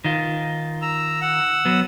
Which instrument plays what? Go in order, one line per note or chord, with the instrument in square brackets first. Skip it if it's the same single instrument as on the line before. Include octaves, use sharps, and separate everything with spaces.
[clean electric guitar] D#3 F4
[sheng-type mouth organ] A#5 E6
F#5 E6
[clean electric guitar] F#3 B3